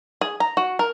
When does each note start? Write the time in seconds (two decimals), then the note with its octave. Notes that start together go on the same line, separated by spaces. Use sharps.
0.21 G#4
0.40 A#5
0.57 F#4
0.79 A#4